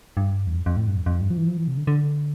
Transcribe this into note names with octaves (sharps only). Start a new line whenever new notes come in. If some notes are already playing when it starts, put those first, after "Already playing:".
G2
E2
F2
F2
A2
G2
F2
F2
G2
F3
E3
F3
E3
C3
D3
D3